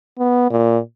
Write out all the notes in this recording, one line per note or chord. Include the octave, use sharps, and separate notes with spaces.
B3
A#2